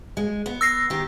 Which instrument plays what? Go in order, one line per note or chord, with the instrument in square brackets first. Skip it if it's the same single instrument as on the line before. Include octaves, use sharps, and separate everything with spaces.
[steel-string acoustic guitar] G#3
B3
[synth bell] E6 A#6 C7
[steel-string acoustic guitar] D#3 G4